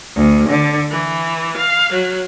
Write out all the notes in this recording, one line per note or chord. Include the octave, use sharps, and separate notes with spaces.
D2
D3
E3
F5
F#3